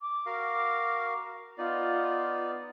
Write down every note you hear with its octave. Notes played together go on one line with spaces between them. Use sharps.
D6
F#4 A#4 F5
B3 D#4 F4 D5